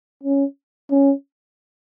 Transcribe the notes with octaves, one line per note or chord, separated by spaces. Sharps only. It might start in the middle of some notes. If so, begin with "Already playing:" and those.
C#4
C#4